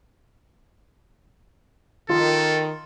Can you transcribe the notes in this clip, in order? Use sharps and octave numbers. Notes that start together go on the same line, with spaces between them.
D#3 F4 A4